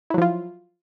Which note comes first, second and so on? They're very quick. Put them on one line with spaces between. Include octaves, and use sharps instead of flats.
E4 F#3 F3 F4